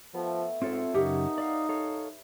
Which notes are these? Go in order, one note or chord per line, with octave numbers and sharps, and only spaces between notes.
F3 A3 B3
G#2 C4 F4 A4 C#5 D5 E5
F#2 C#3 D#4 G4 A#4 F#5
D5 E5 F5 A#5 B5
A4 C#5 F5